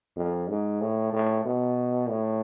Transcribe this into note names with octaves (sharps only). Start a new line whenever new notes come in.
F2
G#2
A2
A2
B2
A2